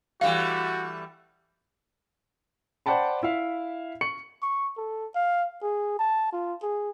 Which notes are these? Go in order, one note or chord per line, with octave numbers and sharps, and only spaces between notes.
E3 G3 A3 F#4 F5
C5 D5 F#5 G5 A5 B5
E4 E5 F5
C#6 C#7 F#7
C#6
A4
F5
G#4
A5
F4
G#4